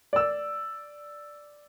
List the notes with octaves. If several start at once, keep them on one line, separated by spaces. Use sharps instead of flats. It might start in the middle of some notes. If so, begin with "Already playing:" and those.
D5 E6